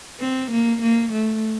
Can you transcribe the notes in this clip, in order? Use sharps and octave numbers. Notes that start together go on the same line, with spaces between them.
C4
A#3
A#3
A3